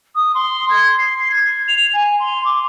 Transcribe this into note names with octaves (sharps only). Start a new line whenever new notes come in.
D#6
C6
G#6
C7
G#6
F7
G#5
C6
D6